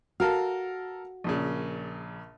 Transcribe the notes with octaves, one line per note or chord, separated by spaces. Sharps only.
F#4 A4 A#4 F5
A#1 A#2 C#3